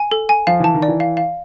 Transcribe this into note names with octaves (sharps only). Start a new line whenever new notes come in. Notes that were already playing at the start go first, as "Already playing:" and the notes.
Already playing: G#5
A4
G#5
F3 F5
E3 A5
D#3
D5
E3
F5
F5